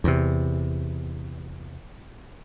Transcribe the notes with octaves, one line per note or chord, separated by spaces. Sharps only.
E2 C3